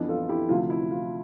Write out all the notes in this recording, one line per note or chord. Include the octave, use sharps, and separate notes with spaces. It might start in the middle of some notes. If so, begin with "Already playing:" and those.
Already playing: F2 E3 B3 D4
F4 A4
E4 G4
D2 C3 F3 F4
E4
F4